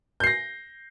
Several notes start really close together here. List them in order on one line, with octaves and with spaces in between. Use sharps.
G6 C7 A#6